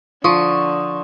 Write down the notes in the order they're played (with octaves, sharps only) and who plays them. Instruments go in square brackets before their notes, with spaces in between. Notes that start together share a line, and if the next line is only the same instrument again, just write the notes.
[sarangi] D3 [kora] F3 [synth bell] C6 C#6 D#6